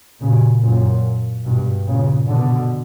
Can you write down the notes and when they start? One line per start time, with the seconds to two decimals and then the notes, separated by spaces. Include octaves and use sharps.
0.20 A#2 C#3
0.62 F#2 A#2
1.45 G2 B2
1.87 A#2 C#3
2.28 B2 D3